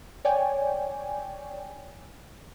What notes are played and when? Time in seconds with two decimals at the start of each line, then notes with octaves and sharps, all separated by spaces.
0.25 C#5 D5 G5 G#5